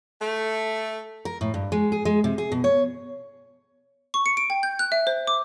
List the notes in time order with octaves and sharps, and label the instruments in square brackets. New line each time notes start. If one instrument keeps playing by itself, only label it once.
[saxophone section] A3
[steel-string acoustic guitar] A#4
A2
G2
G#3
G#4
G#3
C3
G#4
B2
C#5
[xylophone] C#6
C#7
D7
G5
G6
F#6
E5
C5
D6